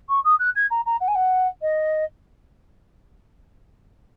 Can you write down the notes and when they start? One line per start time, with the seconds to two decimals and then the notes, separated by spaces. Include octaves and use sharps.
0.09 C#6
0.24 D#6
0.39 F#6
0.56 G#6
0.70 A#5
0.86 A#5
1.01 F#5
1.08 G#5
1.15 F#5
1.61 D#5